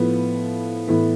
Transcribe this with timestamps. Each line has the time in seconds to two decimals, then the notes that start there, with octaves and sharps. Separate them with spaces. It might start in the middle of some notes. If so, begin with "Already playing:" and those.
Already playing: A2 F3 B3
0.88 A2 E3 B3